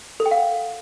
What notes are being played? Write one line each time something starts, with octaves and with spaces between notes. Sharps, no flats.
A4
G5
F5
F#5